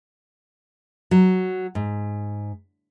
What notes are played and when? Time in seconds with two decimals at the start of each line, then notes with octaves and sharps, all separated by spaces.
1.11 F#3
1.75 G#2